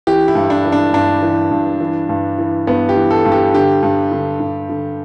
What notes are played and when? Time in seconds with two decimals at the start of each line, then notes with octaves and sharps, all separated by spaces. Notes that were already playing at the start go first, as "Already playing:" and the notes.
0.07 E3 G4
0.28 E4
0.35 G2
0.50 D4
0.65 E3
0.72 D4
0.94 G2 D4
1.22 E3
1.51 G2
1.80 E3
2.09 G2
2.38 E3
2.67 G2 B3
2.89 G4
2.96 E3
3.11 A4
3.25 G2
3.32 G4
3.54 D3 G4
3.83 G2
4.12 D3
4.40 G2
4.69 D3